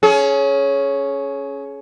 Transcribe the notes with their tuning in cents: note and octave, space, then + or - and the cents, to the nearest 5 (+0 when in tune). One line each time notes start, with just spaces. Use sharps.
C#4 +0 G#4 +30